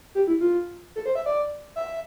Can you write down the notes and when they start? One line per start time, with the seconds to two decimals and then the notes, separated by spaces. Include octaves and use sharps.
0.15 G4
0.27 E4
0.41 F4
0.96 A4
1.06 C5
1.15 E5
1.26 D5
1.76 E5